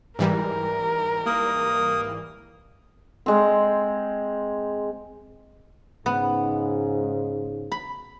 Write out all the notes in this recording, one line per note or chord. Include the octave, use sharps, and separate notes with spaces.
G#2 E3 G3 A#4
A#3 D#6
G#3 C4
G#2 C#3 B3
B5